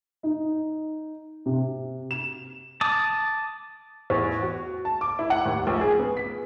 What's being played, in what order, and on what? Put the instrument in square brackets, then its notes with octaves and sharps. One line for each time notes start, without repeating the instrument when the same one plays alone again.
[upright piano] D#4
C3
E7
[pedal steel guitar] A5 D6 D#6
[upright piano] E2
F#4
A5
D6
E4
F#5
D#2
A#1
G#4
B3
B6